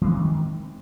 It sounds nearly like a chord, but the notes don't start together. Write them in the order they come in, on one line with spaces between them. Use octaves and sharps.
E3 G#3 C4 D#3